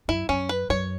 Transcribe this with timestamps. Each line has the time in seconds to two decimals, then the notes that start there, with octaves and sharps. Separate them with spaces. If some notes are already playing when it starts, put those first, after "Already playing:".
0.08 F#2 E4
0.29 F#2 C#4
0.49 B4
0.69 F#2 C#5